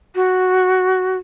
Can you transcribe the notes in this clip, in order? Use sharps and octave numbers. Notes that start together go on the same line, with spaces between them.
F#4